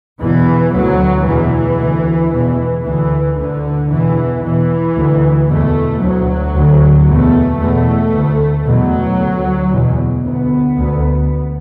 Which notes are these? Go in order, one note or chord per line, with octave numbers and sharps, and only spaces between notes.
E2 B2 E3
D2 F#3
E2 B2 E3
D2
E2 B2 E3
D2 E3
D2 D3
E2 B2 E3
E2 B2 E3
D2
E2 B2 A3
D2 F#3
D2
E2 B2 A3
E2 B2 A3
D2
E2 B2 F#3
D2
E2 B2
D2 B3
D2